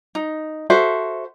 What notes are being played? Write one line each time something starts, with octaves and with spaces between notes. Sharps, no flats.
D#4
F#4 A4 C5 E5